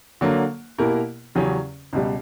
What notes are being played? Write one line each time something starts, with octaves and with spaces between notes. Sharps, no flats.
D3 F#3 A#3
B2 A#3 E4 G4 A#4
E2 C#3 F#3 C#4 G4
C#2 B2 G3